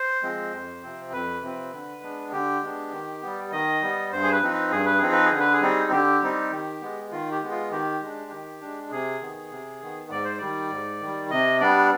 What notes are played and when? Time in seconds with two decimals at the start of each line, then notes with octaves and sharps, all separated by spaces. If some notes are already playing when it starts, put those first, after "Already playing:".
Already playing: C5
0.23 F3 G#3 C4
0.53 F2
0.83 C3 F3 C4
1.12 F2 B4
1.42 C3 F3 C4
1.73 D3
2.02 G#3 B3 D4
2.32 D3 G4
2.62 G#3 B3 D4
2.92 D#3
3.22 G3 B3
3.52 D#3 D#5
3.82 G3 B3
4.12 G2 C5
4.23 G#4
4.32 B4
4.42 F3 C4 D#4
4.52 B4
4.72 G2 G#4
4.86 B4
4.99 F3 C4 D#4 G#4
5.12 B4
5.26 G#4
5.32 D3
5.40 B4
5.53 G#4
5.61 G3 C4 D#4
5.92 D3 G4
6.22 G3 C4 D#4
6.51 D#3
6.81 G#3 B3
7.11 D#3 F4
7.31 G4
7.42 G#3 B3
7.51 F4
7.71 D#3 G4
8.01 G#3 D4
8.31 D#3
8.61 G#3 D4
8.91 C3 G#4
9.21 D#3 B3
9.51 C3
9.81 D#3 B3
10.11 G#2 D5
10.25 C5
10.38 D#3 G3 D5
10.71 G#2
11.01 D#3 G3
11.30 C3 D#5
11.60 G3 B3 D4 D5